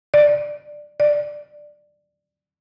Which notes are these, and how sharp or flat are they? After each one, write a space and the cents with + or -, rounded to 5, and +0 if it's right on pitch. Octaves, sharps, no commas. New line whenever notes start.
D5 +10
D5 +10